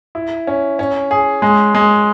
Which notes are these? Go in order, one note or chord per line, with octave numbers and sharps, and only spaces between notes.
E4
C#4
C#4
G#4
G#3
G#3